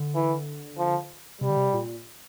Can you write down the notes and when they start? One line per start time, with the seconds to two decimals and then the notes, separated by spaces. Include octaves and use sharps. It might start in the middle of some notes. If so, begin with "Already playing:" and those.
Already playing: D3
0.15 E3
0.78 F3
1.41 C3 G3
1.49 D3
1.56 C3
1.73 A#2